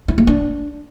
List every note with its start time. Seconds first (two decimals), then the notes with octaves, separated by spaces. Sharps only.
0.08 E4
0.18 A#3
0.27 D4